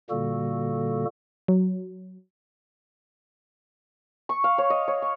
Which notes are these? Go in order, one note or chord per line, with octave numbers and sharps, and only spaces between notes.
A#2 D3 G3 A#3 F#4 A4
F#3
C#6
F5
C#5
D#5
C#5
C#6